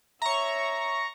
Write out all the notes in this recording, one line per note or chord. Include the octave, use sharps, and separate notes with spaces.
C#5 E5 A#5 C#6